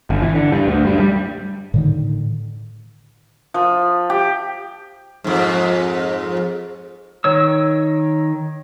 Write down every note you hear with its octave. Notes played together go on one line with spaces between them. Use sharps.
G1
E3
D3
G2
D2
G2
G3
A2 D3 D#3
F3
G4
F2 G#2
D#3 C#5 E6